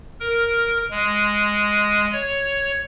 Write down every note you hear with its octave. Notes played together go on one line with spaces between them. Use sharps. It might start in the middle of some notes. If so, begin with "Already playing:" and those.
A#4
G#3
C#5